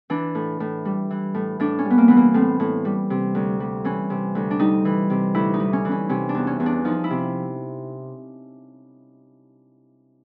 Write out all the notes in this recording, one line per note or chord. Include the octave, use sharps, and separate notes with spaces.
E3 D4
A2
A2
G3
E3
A2
A2 D4
C#4
G3
B3
A#3
E3 B3
A#3
A2 C4
A2
G3
C3
D2
G3
E3 C#4
C3
D2
D4
G3 D#4
E3
C3
D2 E4
D#4
G3
C#4
E3
C#4
C3 C#4
D4
E2
C#4
E2
D4
F3 D#4
E4
C3